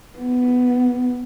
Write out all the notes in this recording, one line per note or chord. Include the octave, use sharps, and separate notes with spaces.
B3